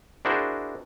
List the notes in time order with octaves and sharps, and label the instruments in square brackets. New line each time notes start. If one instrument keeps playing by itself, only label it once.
[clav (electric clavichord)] D4 E4 F#4 G#4 A#4 C5